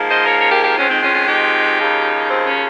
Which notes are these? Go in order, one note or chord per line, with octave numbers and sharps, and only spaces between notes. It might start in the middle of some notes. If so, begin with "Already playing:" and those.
Already playing: G#2 F3 A#3
C5 D#5
A#4 C#5
A#4 C#5
G4 A#4
G4 A#4
F2 D#3 G#3 C4 C#4 F4
C4 D#4
C#4 F4
C#4 F4
D#4 G4
D#2 C#3 F3
C4 D#4
C#4